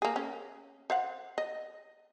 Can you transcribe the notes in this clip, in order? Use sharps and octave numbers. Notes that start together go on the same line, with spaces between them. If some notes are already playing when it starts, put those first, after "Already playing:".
A#3 G#4
C#4
C5 F5 F#5
D#5